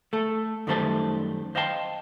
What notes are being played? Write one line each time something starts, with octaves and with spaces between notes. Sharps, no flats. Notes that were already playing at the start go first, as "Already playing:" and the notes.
A3 A4
F#2 D#3 G3 A3 C5 A5
C5 D#5 F5 G5 A5 C6